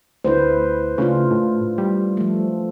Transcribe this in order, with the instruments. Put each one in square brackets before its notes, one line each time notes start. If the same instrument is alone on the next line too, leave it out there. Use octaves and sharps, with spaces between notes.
[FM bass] D2 [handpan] E4 B4 C5
[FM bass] C#3 [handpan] A3 D4 F4
[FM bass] A2
G3
[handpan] F3 A3